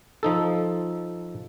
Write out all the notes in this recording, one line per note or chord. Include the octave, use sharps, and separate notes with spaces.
F3 D#4 A4